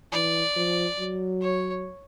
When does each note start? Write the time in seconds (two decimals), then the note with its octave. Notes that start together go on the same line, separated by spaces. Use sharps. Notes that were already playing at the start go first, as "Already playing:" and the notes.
0.12 E3 D5
0.56 F3
0.99 F#3
1.41 C#5